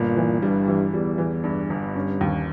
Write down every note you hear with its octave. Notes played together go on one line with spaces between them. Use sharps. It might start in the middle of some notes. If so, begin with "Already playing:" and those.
Already playing: G1 A#2
E3
G2 G3
E3
E2 G3
E3
G2
G1
G2 C#4
D#2